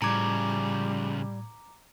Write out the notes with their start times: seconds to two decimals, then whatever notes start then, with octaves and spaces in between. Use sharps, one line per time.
0.02 A2 C#3 F3 G3 A#5 D6 G#6